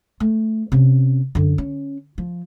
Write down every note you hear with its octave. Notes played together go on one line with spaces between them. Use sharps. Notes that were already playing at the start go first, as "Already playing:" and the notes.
A3
C3 C#4
F#2 D3
C#4
F3